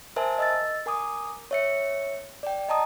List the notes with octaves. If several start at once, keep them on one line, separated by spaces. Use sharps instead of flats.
A#4 C5 E5 G#5 A5
D#5 E6 A6
A#4 G#5 D6 D#6
C#5 E5 C#7
D5 G5
D#5 A5 A#5 D#6